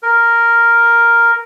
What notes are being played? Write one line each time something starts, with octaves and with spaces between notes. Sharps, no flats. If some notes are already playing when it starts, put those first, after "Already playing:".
A#4